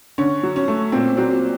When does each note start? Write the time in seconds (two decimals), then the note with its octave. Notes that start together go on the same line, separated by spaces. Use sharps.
0.18 D3 C#4
0.43 F#3
0.56 C#4
0.68 A3
0.92 A#2 C4
1.17 F#3 C4